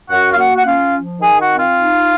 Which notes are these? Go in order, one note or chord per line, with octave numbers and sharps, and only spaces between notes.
F#2 F#4 F#5
F5
A#3 F#4 F#5
F#5
C#4 F4 F5
F3
D#3 G#4 G#5
F#4 F#5
C4
F4 F5
D#4